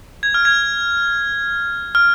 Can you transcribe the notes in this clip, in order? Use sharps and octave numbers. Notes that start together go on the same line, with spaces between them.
G#6
F6
G#6
F6